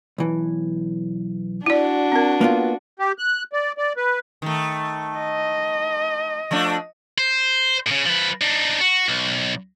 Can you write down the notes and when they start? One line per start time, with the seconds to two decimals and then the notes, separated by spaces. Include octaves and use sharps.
0.18 B1 E3
1.66 D4 E4 F#4 D5
2.12 C4 A#4
2.41 A#3 B3 F4
2.99 G4
3.18 F#6
3.53 D5
3.78 D5
3.97 B4
4.42 D#3 A3
5.17 D#5
6.51 F3 A3 D4
7.18 C5
7.87 A2 C#3
8.06 F3 B4
8.41 D4 D#4
8.81 F#4
9.09 B1